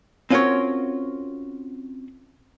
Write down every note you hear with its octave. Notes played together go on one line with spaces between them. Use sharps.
C4 C#4 F4 F#4 A#4 C#5